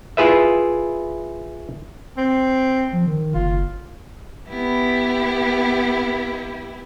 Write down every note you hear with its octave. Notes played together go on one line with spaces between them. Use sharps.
E4 F4 G#4 B4 E5
C4
F3
D#3
F#1 F4
B3 E4 G4